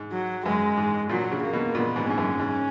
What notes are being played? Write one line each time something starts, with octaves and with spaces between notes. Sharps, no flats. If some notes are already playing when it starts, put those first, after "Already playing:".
Already playing: G#2
F#3
F#2 G#3
G#2
A#2 F#3
C#3
A#3
B2
A#2 B3
G#2
G#2 C#4
F#2
G#2